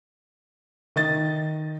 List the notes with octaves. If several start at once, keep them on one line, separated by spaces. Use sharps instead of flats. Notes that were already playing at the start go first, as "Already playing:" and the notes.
D#3 D#5 A6